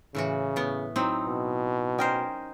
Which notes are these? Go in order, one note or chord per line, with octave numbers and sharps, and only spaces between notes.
A2 C#3 E3 F#4
A2 B3
F#3 C4 D#4 E4
B2
C#4 A#4 C5 D#5 G5